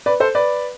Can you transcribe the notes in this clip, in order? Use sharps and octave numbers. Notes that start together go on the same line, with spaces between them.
B4 D5
A4 C5
B4 D5